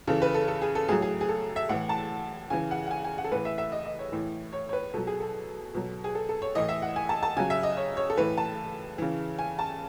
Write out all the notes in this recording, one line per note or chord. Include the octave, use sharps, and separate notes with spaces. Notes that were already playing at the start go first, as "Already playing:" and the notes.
C#3 E3 A4
B4
A4
A4
G#4
A4
A2 F#3 G#4
G#4
G#4
A4
E5
A2 E3 F#5
A5
C#3 E3 G#5
F#5
F#5
G#5
G#5
F#5
A4
A2 E3 B4
E5
E5
D#5
D#5
C#5
A2 E3
C#5
C#5
B4
B2 F#3 A4
G#4
A4
B2 F#3
G#4
A4
A4
C#5
A2 E3 D#5
E5
F#5
G#5
A5
A5
C#3 F#3 G#5
E5
D#5
C#5
C#5
A4
A2 E3 B4
A5
C#3 E3
G#5
A5